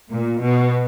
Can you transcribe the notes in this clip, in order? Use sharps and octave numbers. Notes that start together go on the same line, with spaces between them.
A#2
B2